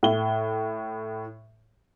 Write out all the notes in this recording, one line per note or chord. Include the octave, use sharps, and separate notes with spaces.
A2 G7